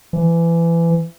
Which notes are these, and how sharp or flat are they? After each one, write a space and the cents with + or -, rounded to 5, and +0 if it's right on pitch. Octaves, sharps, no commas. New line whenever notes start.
E3 +25